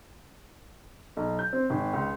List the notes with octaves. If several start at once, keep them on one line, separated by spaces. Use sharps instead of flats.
B1
G6
C4
G#1
C#2